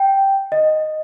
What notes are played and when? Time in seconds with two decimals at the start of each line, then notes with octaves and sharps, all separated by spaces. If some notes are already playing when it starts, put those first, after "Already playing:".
Already playing: G5
0.52 D#5